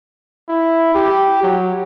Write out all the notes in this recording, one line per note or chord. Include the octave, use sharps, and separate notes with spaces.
E4
G4
F#3